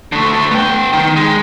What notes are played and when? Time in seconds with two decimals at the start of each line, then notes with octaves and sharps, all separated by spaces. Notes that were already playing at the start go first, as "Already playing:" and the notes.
0.12 D3 A3
0.51 B3 G5
0.93 D#3
1.16 G#3